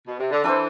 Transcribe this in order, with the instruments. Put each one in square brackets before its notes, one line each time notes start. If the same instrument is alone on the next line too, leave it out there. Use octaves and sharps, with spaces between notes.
[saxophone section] B2
C3
D3
[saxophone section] E3 [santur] D4 A4 C5